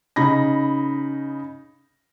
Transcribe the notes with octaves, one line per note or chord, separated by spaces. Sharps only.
C#3 D#4 B5 A#6